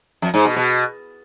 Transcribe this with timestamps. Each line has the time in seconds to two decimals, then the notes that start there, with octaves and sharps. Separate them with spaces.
0.22 F2
0.34 G#2
0.45 B2
0.56 B2